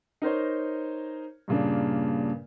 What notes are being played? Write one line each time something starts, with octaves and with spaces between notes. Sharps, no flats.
D#4 A#4 C5 C#5
G2 A#2 C#3 A#3 D4